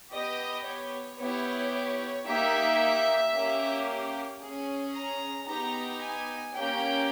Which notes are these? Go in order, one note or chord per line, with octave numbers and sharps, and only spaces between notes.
B3 G4 D#5
C#5
B3 E4 G4 C#5
C#5
A#3 D#4 G4 E5
A#3 C#4 G4
C#4 G#4
A#5
B3 D#4 G4 A#5
G#5
A#3 C#4 G4 G5